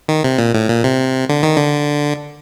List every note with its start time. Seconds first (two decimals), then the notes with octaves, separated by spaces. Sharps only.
0.08 D#3
0.24 C3
0.38 A#2
0.54 A2
0.69 A#2
0.84 C3
1.29 D3
1.43 D#3
1.57 D3